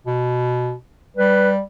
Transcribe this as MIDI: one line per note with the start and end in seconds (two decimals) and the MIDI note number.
0.07 0.74 47
1.17 1.60 55
1.17 1.50 71